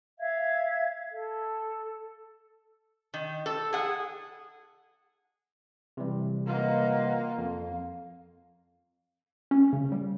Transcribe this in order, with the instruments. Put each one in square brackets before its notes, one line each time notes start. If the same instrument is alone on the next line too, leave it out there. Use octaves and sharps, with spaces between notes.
[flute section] E5 F5 G#6
A4
[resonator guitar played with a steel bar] D#3
A4
G#4 F#5
[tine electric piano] C3 E3 G3
[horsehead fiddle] A#3 F4 [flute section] B4 D#5 F#5
[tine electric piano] F2 [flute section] F5
[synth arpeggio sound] C#4
C#3
G3